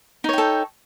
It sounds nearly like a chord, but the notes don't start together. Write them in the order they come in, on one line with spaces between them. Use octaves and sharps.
D#4 C#5 G5 A4